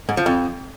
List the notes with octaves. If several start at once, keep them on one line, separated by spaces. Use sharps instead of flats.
G#2
F3
F2